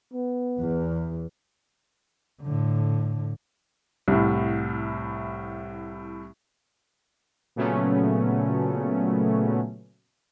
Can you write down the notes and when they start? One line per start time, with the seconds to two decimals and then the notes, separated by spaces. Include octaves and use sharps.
0.13 B3
0.59 E2
2.42 A2 D3
4.08 C2 A2
7.56 A#2 C#3 F#3 A3 B3 C#4